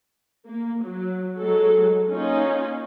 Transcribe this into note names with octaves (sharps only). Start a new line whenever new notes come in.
A#3
F#3
F#3 G#3 A4
A#3 C#4 D#4 F4